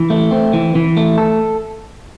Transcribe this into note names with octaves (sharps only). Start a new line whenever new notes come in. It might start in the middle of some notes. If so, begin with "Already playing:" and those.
Already playing: E3
A3
C4
E3
E3
A3
A4